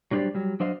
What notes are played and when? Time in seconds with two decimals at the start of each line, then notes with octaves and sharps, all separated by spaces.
0.11 F#3 G3 D4 G4 C5 D5
0.35 F#3 G3
0.60 F#3 D4 C5 D#5 F5